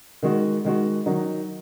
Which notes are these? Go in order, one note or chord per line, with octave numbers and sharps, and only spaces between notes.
D#3 G#3 F#4
D#3 G#3 F#4
D#3 F#3 D#4